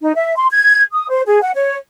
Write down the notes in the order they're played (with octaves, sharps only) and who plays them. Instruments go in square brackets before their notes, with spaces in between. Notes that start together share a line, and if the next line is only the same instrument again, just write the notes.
[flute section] D#4
E5
C6
G#6
D#6
C5
G#4
F#5
C#5